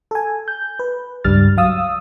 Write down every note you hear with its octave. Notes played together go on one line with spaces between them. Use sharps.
A4 G#5
G6
B4
C#2 G2 G3 F6 A6
F#3 F5 D#6 E6